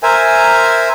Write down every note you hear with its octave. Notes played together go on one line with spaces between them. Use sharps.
A#4 C5 E5 G#5